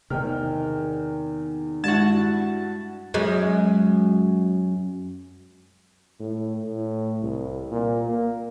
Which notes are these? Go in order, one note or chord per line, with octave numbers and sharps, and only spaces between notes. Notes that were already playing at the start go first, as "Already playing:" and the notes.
E2 C3 D#3 G5 F6
G2 G3 G#3 E4 F#4 A5
F#2 G#3
A2
A2
C2
A#2
A#3